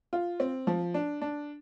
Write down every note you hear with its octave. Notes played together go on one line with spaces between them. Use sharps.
F4
C4
F3
D4
D4